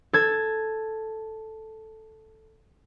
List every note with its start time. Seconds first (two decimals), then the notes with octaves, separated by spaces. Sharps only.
0.13 A4 G#6